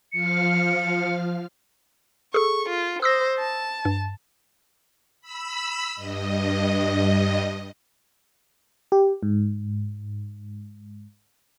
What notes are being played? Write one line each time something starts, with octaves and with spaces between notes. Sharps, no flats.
F3 F5 F6 C#7
G#4 A4 C#6
F4
C5 D#6 E6 A#6
A5
G2
B5 E6
G2 D#5
G4
G#2